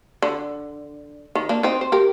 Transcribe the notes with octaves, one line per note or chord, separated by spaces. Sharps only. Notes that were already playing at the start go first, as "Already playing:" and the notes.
D3
D#3
A#3 D4
C4 D#4
C5
G4 A#4